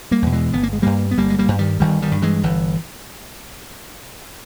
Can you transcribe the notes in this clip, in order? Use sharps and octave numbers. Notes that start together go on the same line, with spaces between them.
G3 A#3
E2 B2
E3 G#3
G1 B3
A#3
G#3
G2 G3 A#3
B3
G1 G3 A#3
G#3
G3 A#3
G2
D#3 G3
G1 D#3 G3
D#3 G3
G2
E3 G#3
G1 E3